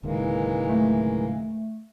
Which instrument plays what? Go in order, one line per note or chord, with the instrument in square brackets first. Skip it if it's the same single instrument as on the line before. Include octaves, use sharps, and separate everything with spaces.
[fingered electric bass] D1 C#2 D#3 [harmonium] E3 G#3 A#3
[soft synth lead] A3